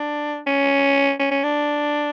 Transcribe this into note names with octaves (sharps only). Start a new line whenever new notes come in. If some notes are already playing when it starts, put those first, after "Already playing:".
Already playing: D4
C#4
C#4
C#4
D4